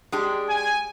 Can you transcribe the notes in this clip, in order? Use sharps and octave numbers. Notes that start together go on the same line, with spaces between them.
G#3 D4 G4
G#5